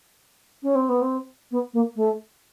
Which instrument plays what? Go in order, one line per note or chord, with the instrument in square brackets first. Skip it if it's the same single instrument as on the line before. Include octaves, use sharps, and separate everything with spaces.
[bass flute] C#4
C4
B3
C4
B3
A#3
A3